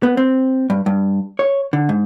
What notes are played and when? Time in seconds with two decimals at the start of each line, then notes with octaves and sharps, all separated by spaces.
0.03 B3
0.17 C4
0.70 G2
0.86 G2
1.39 C#5
1.73 D3
1.89 G#2